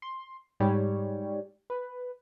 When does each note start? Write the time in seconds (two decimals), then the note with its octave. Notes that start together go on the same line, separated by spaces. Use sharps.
0.02 C6
0.60 G#2 G3 C#5
1.70 B4